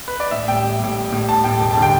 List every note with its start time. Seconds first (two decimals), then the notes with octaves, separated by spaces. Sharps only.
0.08 B4
0.20 D5
0.31 A1 E5
0.47 A2 G3 G5
0.64 A1
0.80 A2 G3
0.96 A1
1.12 A2 G3
1.28 A1 A5
1.44 A2 G3 G5
1.60 E1 G5
1.71 A5
1.77 D3 G3
1.82 G5